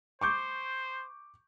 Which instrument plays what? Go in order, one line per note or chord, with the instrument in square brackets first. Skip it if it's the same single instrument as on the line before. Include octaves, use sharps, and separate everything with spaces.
[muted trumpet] C5 [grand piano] C#6 D6 G6